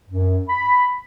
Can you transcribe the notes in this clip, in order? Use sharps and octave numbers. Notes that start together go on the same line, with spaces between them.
F#2
B5